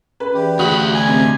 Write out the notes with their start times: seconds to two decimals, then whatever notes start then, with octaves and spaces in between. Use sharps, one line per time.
0.20 C#4 B4
0.34 E3 G4 G#4 D5
0.59 D2 F#4 B5 D#6
0.94 G#5
1.07 C3 D#5